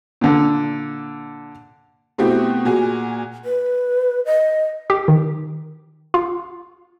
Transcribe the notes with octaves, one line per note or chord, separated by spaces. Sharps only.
A#2 D3
B2 A3 C4 E4 F#4 G4
A#2 F#4 G#4
B4
D#5
G4
D#3
F4